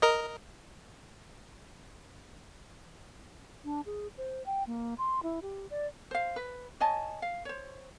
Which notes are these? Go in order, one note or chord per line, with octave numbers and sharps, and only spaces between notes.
A#4 D#5
D4
G#4
C5
G5
A#3
C6
E4
G4
D5
C5 F5
B4
C#5 D#5 G#5 A5
F5
C5 C#5